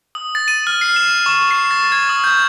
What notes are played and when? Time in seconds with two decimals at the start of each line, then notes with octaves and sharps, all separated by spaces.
0.15 D#6
0.35 A6
0.48 D#7
0.67 F6
0.81 C7
0.96 E7
1.26 C#6
1.51 C7
1.71 A6
1.92 G#6
2.09 D#6
2.24 G6